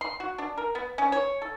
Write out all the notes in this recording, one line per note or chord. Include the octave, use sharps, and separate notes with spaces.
C6
F#4
D4
A#4
B3
C#4
C#5
A4